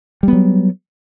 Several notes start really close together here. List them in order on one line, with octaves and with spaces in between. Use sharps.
G3 B3 F#3